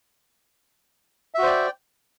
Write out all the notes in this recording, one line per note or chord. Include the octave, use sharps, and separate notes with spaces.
F#4 C5 D5 E5 G5